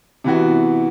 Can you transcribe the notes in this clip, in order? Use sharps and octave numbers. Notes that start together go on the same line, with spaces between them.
C3 E3 B3 F#4